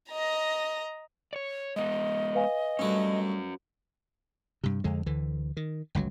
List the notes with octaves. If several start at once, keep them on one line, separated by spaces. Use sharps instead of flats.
D#5 A#5
C#5 D5
G#3 B3 D#5
B4 F5 G#5
G2 A3 C#4 F#4
G2 C3
F2 D3 G#3
D2 D3 E3
D#3
G1 C#2 C3 F#3